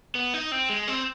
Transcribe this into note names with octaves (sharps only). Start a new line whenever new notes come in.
B3
D#4
C4
G#3
C4